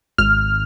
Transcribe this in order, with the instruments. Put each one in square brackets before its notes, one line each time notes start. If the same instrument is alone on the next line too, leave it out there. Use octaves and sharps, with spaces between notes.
[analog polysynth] G#1 F6